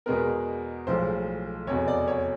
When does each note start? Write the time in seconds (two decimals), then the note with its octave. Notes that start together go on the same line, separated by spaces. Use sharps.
0.06 E2 B2 G#3 B3 A#4
0.87 B1 A2 F3 G#3 C5
1.67 F1 E2 B2 C#5
1.88 D5
2.08 C#5